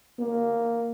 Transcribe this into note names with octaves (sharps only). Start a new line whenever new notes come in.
A#3